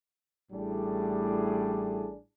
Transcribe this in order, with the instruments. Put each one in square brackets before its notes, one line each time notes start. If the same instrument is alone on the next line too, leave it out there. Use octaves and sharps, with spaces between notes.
[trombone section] A1 A2 G3 D4 G#4